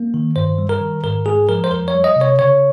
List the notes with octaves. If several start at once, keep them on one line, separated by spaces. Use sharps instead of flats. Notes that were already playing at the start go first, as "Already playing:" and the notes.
Already playing: A#3
D#3
G2 C5
G3
A#4
D#3
G#2 A#4
G#3 G#4
F3 A#4
C5
F2 A#4
C#5
G3
D#5
C3
C#5
C#3 C#5